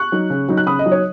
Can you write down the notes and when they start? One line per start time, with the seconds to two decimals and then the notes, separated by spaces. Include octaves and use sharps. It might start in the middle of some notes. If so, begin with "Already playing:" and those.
Already playing: C#6 F#6
0.12 F#3 D#4
0.30 C#3
0.49 F#3 D#4
0.57 F#6
0.67 C#3 B5 D#6
0.79 D#5
0.86 F#3 D#4
0.92 C#5